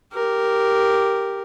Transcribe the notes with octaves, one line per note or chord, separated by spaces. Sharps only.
G4 A#4